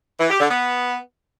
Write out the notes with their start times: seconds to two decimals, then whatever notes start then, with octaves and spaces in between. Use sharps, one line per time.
0.20 E3
0.30 G4
0.40 D3
0.50 B3